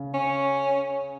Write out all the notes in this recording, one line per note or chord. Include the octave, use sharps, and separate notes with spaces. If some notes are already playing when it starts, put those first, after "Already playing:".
Already playing: C#3
C#4